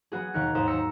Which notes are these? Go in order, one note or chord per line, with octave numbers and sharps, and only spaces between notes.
F#3 B3 F#4 G#4
D#2 B2 D#3 A#4 F#6 C#7
D#2 G#2 C5 A#5 D#6 E7
E6 A#6 C#7